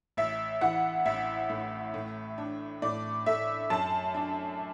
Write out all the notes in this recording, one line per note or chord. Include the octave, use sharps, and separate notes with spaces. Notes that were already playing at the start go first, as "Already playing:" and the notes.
A1 E5
E3 F#5
A1 E5
A2
A2
D4
A2 D5
A3 E5
F#2 A5
D4